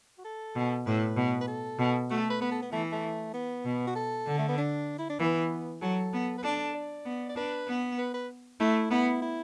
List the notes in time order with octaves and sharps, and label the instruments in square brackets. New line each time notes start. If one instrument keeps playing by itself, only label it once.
[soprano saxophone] F#4
A4
[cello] B2
[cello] A2 [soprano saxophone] B4
[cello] B2
[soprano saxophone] B4
A4
[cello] B2
[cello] A3 [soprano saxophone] F#4
[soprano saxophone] A4
B4
[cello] B3 [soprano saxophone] B4
[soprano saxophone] A4
B3
[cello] E3 [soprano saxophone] A3
[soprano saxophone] A3
B3
[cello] B2
[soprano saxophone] F#4
A4
[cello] D3
[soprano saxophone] A3
B3
D4
E4
D4
[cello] E3 [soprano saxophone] B3
[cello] F#3 [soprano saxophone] A4
[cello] B3
[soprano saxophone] B4
[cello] D4 [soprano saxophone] A4
[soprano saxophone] D5
[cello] B3
[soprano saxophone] D5
[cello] D4 [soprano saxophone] B4
[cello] B3
[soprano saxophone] B4
B4
[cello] A3 [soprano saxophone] E4
[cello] B3 [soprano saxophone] E4
[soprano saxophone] E4